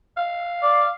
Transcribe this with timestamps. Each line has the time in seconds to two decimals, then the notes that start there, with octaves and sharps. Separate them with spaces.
0.17 F5
0.62 D5